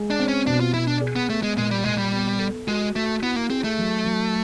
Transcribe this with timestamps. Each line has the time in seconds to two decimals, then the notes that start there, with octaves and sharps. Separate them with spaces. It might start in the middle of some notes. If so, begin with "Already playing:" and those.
Already playing: G#3
0.10 D4
0.20 C4
0.28 C#4
0.47 B2 D4
0.60 F4
0.74 B2 E4
0.87 D4
1.01 G#4
1.16 B3
1.30 A3 B3
1.43 G#3
1.56 A#2 G#3
1.71 G3
1.84 A#2 G#3
1.98 G3
2.12 B3
2.39 A4
2.67 G#3 F#4
2.95 A3 F#4
3.22 B3 E4
3.36 A#3
3.50 C4 G#4
3.64 A3
3.78 F#3
4.05 F#3